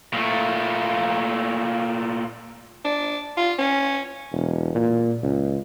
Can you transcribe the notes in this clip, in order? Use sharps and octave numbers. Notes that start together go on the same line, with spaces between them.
A#2 A3
D4
F4
C#4
E1
A#2
C#2